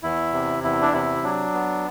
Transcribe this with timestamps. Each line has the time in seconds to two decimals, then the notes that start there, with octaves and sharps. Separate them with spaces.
0.03 E2 E4
0.33 C3
0.64 E2 E4
0.82 D4
0.93 C3 E4
1.23 F#3 D4
1.54 B3